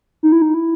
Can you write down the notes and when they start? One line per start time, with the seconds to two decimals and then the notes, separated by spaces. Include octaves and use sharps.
0.23 D#4
0.32 E4
0.42 D#4
0.54 E4